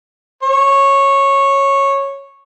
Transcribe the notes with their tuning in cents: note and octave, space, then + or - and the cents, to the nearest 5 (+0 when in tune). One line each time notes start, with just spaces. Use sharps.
C#5 -10